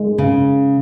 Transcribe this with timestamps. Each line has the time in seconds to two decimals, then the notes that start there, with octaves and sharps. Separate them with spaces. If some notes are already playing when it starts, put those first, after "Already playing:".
Already playing: G#3
0.18 C#3